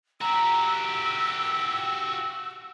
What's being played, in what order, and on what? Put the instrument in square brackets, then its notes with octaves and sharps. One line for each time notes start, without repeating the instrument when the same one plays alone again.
[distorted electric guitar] F#4 G4 [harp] A#5 [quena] E6